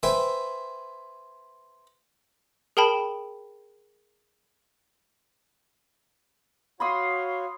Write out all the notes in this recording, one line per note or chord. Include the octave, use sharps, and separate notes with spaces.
B4 C5 E5 G5 G#5
G#4 A#4 G5 A5 B5
F#4 C#5 F5 B5 C6 D#6